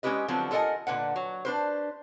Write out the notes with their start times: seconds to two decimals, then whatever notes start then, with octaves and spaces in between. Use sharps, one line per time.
0.03 G#3 C#4 E4 G4 B4 D#5
0.28 D3 F3 F#3 B3 C4
0.51 F4 A4 A#4 D#5 F#5 G#5
0.87 A#2 D3 B4 F#5
1.16 F#3
1.45 D4 B4 C5